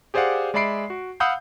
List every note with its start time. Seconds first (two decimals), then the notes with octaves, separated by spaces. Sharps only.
0.14 G4 G#4 C5 D5 F5 F#5
0.54 G#3 D5 E5 B5 C7 D7
0.90 F#4
1.20 F5 F#5 B5 D#6 E6 G6